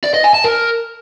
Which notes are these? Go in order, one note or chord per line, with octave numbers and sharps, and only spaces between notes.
D5
D#5
G#5
A5
A#4